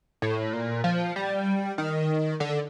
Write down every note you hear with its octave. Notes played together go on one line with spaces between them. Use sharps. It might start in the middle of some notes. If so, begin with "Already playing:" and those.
A2
A#2
F3
G3
D#3
D3